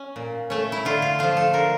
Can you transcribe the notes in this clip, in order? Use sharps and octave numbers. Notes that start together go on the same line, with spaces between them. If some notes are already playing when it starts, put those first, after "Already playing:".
Already playing: C#4
A#2
A3 C#4
E4
D3 F4
F4
F3 A3 F4
A4
D3 A#4